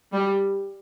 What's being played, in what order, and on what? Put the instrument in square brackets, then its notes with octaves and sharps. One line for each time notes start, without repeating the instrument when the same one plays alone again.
[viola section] G3